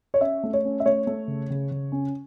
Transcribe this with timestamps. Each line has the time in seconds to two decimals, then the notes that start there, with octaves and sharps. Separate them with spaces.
0.14 C#5
0.21 C#4 E5
0.43 A3
0.53 C#5
0.65 C#4
0.80 E5
0.86 A3 C#5
1.07 A3
1.28 C#3
1.50 C#3
1.71 C#3
1.92 C#4